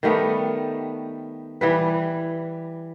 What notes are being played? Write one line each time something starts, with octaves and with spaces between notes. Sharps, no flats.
D#3 G3 A3 B3
E3 G3 B4